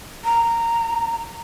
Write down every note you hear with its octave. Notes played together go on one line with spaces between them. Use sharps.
A#5